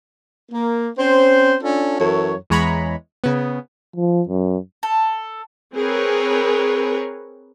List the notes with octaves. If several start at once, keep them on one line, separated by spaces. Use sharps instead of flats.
A#3
C4 C#4 C5
C#4 D4 F4 A4
F#2 E3 A4 C#5
E2 G#3 C#5 A#5 B5
C#3 B3
F3
F#2
A4
C4 G#4 A#4 B4 C#5